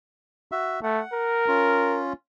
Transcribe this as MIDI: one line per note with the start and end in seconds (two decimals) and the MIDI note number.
0.52 0.80 66
0.52 0.80 76
0.83 1.02 57
0.83 1.45 78
1.14 2.02 70
1.48 2.13 61
1.48 2.13 65